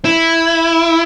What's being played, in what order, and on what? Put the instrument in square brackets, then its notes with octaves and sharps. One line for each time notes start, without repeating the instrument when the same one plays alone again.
[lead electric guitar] E4